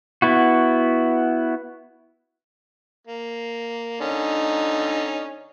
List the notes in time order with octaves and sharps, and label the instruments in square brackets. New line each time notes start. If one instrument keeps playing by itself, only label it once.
[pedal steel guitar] B3 E4 F#4
[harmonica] A#3
D3 C#4 D#4